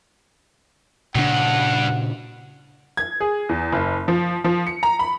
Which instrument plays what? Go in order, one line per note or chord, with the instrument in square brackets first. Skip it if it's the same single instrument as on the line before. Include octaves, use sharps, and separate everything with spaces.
[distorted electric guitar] G2 [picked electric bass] A#2 C#3 D4 [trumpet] F#5
[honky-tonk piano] G#6
G#4
E2
F#1
F3
F3
C#7
A#5
B5